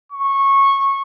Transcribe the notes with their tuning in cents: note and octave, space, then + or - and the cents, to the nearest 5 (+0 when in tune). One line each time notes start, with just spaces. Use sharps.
C#6 -15